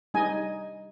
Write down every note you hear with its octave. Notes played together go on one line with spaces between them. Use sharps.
G3 D#4 D#5 G#5